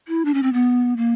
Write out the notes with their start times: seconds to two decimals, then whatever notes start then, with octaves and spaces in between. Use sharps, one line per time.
0.08 E4
0.25 D4
0.34 C#4
0.43 C4
0.53 B3
0.97 A#3